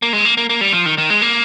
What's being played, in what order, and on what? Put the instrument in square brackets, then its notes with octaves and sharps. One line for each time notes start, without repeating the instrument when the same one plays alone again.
[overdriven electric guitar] A#3
G#3
A#3
A#3
A#3
G3
F3
D#3
D#3
G#3
A#3